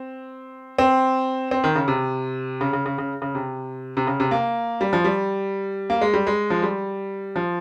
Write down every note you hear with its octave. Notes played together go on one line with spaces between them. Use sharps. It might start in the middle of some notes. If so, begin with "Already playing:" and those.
Already playing: C4
C4
C4
D#3
C#3
C3
C#3
C#3
C#3
C#3
C#3
C3
C3
C#3
C3
A#3
G3
F3
G3
A#3
G#3
G3
G#3
F3
G3
F3